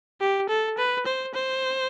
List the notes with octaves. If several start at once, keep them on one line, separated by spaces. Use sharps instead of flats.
G4
A4
B4
C5
C5